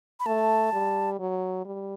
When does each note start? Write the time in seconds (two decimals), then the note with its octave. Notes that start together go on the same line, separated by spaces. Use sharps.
0.20 B5
0.26 A3 A5
0.73 G3
1.19 F#3
1.65 G3